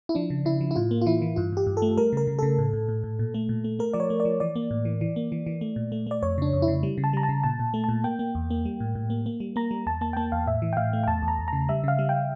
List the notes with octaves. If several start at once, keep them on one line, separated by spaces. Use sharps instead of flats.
E4
F3 D4
C#3
C#3 E4
F3
E4
A2 F4
A#3
F4
E3 E4
E3
G2 F4
G2 G4
G2
A4
A3
G3 A#4
C#3 A#4
C#3
C#3 A4
A2
A2
A2
A2
A#2
A3
A#2
A3
A3 A#4
F3 D5
C#5
A3
D5
F3
E3 D5
A#3
A2
E3
E3
A#3
E3
E3
A3
A#2
A3
A3 D5
F2 C#5
C#3 D4
F2
E4
C#3
G3
C#3
A5
G3 A#5
A5
C#3
A#2 A5
A#2
A3
A#2 A5
A#3 G5
A#3
E2
A#3
G3
A2
A2
A#3
A#3
G3
A#3 A#5
G3
E2 A5
A#3 A5
G5
A#3 A5
E2 F5
A2 E5
E3
G5
A2 F5
A3
G5
E2 A5
E2
A#5
E2
C#3 A#5
G3 E5
C#3 F5
G3
G5